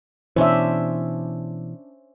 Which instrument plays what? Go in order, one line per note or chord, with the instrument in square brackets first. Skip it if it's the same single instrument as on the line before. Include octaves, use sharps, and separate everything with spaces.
[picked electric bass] B2 E3 [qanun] C#4 D4 [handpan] C5 E5